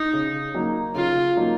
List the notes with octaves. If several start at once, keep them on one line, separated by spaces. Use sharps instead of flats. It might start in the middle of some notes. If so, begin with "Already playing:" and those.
Already playing: D#4
C#3
F#3 A#3 D#4
C#3 F4
F#3 A#3 D#4